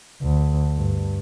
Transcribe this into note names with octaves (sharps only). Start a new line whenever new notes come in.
D2
G2